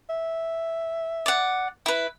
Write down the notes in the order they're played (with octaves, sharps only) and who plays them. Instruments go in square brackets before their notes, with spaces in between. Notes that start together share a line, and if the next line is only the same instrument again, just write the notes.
[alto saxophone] E5
[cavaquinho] D5 F#5
E4 B4